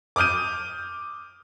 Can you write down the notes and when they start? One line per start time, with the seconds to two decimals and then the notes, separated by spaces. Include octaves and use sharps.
0.16 D6 D#6 F6 G6 D#7